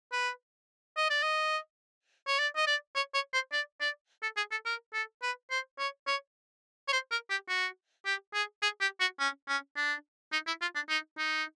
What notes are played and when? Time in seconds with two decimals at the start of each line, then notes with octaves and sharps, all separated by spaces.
0.13 B4
0.97 D#5
1.10 D5
1.23 D#5
2.28 C#5
2.39 D5
2.57 D#5
2.67 D5
2.96 C#5
3.14 C#5
3.34 C5
3.52 D5
3.81 D5
4.23 A4
4.37 G#4
4.52 A4
4.66 A#4
4.94 A4
5.22 B4
5.51 C5
5.79 C#5
6.07 C#5
6.88 C#5
6.93 C5
7.11 A#4
7.30 G4
7.49 F#4
8.06 G4
8.34 G#4
8.62 G#4
8.81 G4
9.00 F#4
9.20 C#4
9.48 C#4
9.77 D4
10.33 D#4
10.47 E4
10.62 F4
10.75 D4
10.89 D#4
11.18 D#4